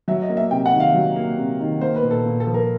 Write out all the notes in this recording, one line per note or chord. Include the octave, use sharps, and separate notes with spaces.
F#3 E5
D#5
A#3
E5
C3 G5
F#5
D#3
F5
F#3
A#3
C3
D#3
A#3 C5
B4
A#2
A4
A#2
A4
F3
A#4